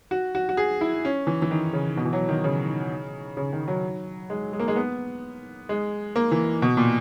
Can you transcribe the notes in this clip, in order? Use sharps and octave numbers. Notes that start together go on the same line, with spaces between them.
F#4
F#4
F#4
G#4
E4
C#4
E3
E3
D#3
C#3
B2
E3
F#3
D#3
C#3
C#3
D#3
F#3
G#3
G#3
A#3
G#3
B3
G#3
A#3
E3
B2
A#2